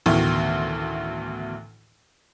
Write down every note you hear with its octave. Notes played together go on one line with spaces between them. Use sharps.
A1 D2 B2 D#3 E3